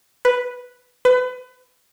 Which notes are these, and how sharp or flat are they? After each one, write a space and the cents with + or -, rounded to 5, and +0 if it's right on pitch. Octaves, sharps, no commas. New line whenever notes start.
B4 +0
B4 +30